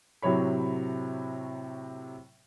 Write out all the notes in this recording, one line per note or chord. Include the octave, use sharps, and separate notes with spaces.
A2 C3 F#3 C#5 B5